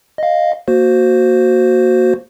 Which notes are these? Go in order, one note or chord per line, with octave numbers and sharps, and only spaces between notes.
D#5 F5
A#3 F#4 C5